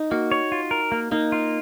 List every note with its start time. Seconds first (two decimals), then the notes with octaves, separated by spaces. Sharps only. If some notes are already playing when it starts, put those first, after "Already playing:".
Already playing: D#4
0.11 A#3 F#4
0.32 C#5
0.52 F4
0.71 A#4
0.92 A#3
1.11 A#3 D#4
1.32 F4